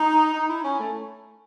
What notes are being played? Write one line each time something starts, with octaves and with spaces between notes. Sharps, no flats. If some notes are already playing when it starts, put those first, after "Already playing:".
Already playing: D#4
D#4
E4
C#4
A3